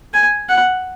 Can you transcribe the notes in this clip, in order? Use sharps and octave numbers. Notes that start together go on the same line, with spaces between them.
G#5
F#5